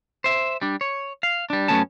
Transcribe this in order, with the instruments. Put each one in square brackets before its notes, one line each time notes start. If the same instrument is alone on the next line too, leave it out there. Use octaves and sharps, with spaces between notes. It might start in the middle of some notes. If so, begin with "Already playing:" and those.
[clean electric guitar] C5 E5
G3 D4
C#5
F5
G3 D4
F#2 E3 A3 B3 C#4 A5